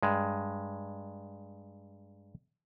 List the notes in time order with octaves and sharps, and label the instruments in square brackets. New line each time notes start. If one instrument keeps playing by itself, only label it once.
[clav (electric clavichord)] G2 G#3